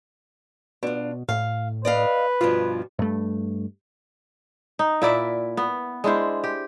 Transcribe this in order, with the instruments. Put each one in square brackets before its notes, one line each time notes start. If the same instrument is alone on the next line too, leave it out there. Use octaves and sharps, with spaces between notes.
[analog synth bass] B2 [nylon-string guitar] D4 F4
[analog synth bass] A2 [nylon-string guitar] F5
[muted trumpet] B4 [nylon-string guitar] D5 D#5 F5
[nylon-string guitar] G2 B2 F3 [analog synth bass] F4
[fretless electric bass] G2 A3
[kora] D#4
A#2 E4 D5 E5
B3
G#3 D4 E4 C5
G4